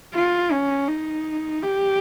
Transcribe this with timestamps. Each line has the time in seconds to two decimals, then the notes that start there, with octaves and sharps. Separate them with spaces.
0.14 F4
0.52 C#4
0.88 D#4
1.63 G4